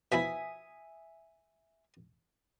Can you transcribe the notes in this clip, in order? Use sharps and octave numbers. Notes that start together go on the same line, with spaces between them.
B2 F3 E4 E5 G#5 D#6